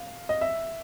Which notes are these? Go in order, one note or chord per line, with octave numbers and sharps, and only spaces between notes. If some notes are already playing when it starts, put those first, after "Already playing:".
Already playing: F5
D#5
E5